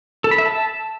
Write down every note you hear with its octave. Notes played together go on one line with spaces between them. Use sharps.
A4
B5
E5
A5